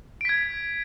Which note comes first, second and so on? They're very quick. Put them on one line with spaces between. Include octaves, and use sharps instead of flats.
D7 B6 G#6